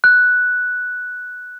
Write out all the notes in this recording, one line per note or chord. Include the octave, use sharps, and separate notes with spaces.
F#6